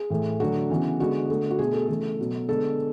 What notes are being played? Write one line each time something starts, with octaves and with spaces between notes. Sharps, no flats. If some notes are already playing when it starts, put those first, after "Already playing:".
Already playing: G#4
A2 E3 A3
D3 F#3 A3 F#4
C#3 E3 B3
D3 G#3 B3 F#4
D3 A3
F#4
B2 A3 G#4
A4
C#3 E3 A3
B2 F#3 B3
D3 G#3 B3 A4